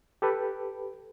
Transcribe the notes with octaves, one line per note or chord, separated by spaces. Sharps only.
G4 A4 B4